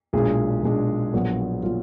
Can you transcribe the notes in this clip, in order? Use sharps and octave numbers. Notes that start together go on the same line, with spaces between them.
B1 A#2 G#3 D4 G#4
B1 A#2 G#3 D4
A#1 A#2 F#3 B3
A#2 F#3 B3 F4